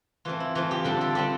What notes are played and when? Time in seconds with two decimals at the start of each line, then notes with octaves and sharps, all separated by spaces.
0.25 E3 A3 C4 F4
0.40 E4
0.55 E3 A3 C4 F4
0.71 G4
0.84 D3 G3 C4 A4
1.01 A4
1.15 D3 G3 C4 G4